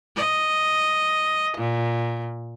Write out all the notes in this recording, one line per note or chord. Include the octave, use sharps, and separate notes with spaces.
D#5
A#2